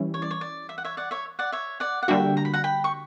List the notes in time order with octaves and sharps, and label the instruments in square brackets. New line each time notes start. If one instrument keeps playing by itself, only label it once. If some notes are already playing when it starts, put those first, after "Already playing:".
Already playing: [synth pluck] E3 G3 C#4 E4
[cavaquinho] C#5
D5
C#5
D5
E5
F#5
C#5 E5
D5 F#5
C#5 E5
D5 F#5
C#5 E5
D5 F#5
F#5
[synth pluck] D3 G3 A#3 D4 F#4 [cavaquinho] E5 G5
[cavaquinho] A#5
B5
F#5 A#5
G5 B5
C#6